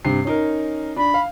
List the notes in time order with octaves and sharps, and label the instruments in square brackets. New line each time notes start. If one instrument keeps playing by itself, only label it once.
[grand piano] G2 C3 C7
C#4 D#4 A#4
[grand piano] D4 [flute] B5
[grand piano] F5